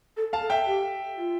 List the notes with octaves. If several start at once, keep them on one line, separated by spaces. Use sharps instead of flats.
A4
F5 A5
A4
E5 G5
G4
F4